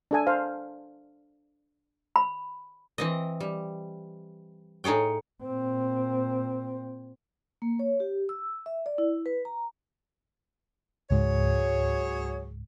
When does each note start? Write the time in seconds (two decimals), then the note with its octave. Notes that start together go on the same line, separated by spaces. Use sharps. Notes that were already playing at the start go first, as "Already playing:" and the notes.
0.11 D4 A4 G#5
0.27 C5 F5
2.16 B5
2.98 E3 C4 D#5
3.40 G3
4.84 A2 D#4 G#4 C#5 G5
5.44 A#2 C4
7.62 A#3
7.79 C#5
8.00 G4
8.29 E6
8.66 E5
8.86 D5
8.98 E4
9.26 B4
9.45 A#5
11.10 C#2 G#2 F#3 G#4 C#5